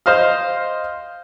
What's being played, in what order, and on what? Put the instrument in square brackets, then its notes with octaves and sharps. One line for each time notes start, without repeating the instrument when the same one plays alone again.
[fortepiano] C5 D#5 F5 F6